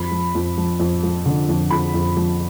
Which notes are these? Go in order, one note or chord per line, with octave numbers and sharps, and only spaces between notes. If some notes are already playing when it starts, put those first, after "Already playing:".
Already playing: F2 B5
F3
F2
F3
F2
F3
D3
F2
F2 B5
F2
F3